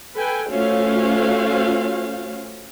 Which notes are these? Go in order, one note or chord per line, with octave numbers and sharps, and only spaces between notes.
A4 B4 G5 G#5
A3 C#4 F4 F#4 C5 F5